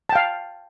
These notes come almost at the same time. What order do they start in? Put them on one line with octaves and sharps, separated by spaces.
A5 G5 F5